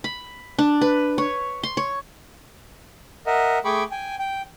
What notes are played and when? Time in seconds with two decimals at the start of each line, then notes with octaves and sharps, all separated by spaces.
0.04 B5
0.59 D4
0.81 B4
1.18 C#5
1.63 C6
1.77 C#5
3.26 A#4 D#5 E5 F#5
3.65 A3 G#4 G5 B5 C#6 D6
3.91 G5 G#5
4.19 G5